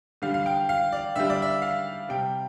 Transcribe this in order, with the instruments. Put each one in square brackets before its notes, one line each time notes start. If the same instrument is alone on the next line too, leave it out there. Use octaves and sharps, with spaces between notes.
[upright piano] D3 G3 F5
F5
G5
F5
D5
D3 G3 E5
D5
E5
F5
C3 G3 G5